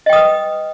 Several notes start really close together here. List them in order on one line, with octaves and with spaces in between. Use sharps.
D#5 G5 D#6 B4